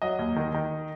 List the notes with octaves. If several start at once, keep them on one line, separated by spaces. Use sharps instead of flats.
F#3 D#5
D#2
D#3
D#3